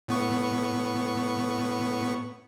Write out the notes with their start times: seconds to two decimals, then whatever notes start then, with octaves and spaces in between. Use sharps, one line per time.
0.08 A2 B3 C#6